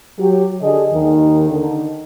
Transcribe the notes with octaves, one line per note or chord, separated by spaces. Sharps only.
F#3 G4
D3 G#4 D#5
D#2 D#3
D3 D#3